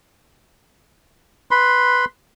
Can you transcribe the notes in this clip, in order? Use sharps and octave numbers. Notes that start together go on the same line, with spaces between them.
B4 B5 C6